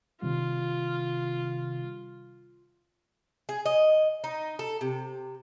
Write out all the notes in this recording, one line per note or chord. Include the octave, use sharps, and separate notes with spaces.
C3 D#3 G3 F4
G#4
D#5
D#4
A4
C3